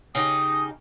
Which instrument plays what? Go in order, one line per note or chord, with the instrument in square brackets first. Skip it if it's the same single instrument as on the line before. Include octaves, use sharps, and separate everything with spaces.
[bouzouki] C#3 D#4 G4 [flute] D#6